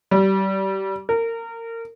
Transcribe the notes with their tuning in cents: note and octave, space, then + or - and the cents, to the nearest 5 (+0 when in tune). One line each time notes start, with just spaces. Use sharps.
G3 -25
A#4 -25